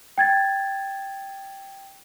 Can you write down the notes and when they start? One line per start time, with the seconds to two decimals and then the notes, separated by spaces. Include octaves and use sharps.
0.18 G5 G#6 A6